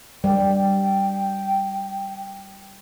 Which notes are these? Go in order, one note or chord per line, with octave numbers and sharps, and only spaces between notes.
G3 G5